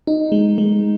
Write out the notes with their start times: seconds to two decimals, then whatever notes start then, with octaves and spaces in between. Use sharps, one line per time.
0.07 D#4
0.32 G#3
0.58 G#3